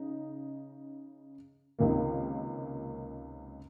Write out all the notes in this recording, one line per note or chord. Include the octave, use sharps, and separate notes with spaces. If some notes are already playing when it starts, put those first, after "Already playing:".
Already playing: C#3 D#4
C#2 C3 D#3 A#3